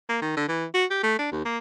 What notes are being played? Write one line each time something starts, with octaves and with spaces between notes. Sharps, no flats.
A#3
D#3
D3
E3
F#4
G4
A3
D4
D#2
A#3